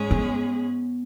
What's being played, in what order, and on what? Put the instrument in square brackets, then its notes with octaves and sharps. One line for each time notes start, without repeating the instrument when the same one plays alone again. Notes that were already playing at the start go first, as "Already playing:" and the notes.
Already playing: [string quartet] G#2 G#3 C#4 G#4
[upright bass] B3